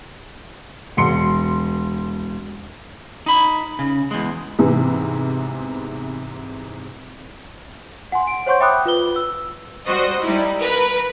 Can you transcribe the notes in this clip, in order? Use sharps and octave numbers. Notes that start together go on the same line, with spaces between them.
E1 C6 C#7
D#4 B5
C#3
E2 G#3
G#2 C3 E3 B3
F#5 G#5 C6
D7
C5 C#5 F#5 C6 C#6 G6
E5 G5 B5 D6 D#6 F#6
F4 B4 G7
E6
G3 F#4 C5 D#5
G3 D#4 E4
A#4 B4 B5